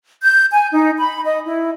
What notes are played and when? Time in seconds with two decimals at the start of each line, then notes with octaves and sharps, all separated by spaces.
0.21 G6
0.53 G#5
0.73 D#4
0.98 B5
1.23 D#5
1.46 E4